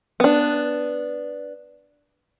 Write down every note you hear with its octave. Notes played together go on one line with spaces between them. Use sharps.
B3 D4